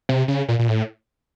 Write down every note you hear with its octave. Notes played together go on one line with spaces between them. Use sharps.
C3
C#3
A#2
A#2
A2